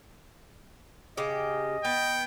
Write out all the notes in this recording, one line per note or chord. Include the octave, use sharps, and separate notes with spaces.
C#3 G4 D#5
B3 G5